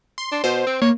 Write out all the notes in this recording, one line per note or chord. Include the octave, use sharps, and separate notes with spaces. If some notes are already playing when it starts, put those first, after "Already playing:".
C6
D4
B2 C5
C4
A#3 C#5